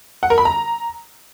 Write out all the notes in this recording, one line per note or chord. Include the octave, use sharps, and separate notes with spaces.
F#5
A#4
B5
A#5